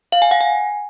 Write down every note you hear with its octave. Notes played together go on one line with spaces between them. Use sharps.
F5
G#5
F#5
G#5